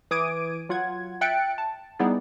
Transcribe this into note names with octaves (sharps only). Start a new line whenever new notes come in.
E3 D6 D#6 G#6 D7 D#7
F#3 F4 F#5 G#6
E5 G5 F#6 A6 C#7 D7
A5
G3 B3 D#4 E4 G#4 D5